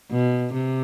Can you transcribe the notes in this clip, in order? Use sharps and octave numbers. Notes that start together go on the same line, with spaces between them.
B2
C3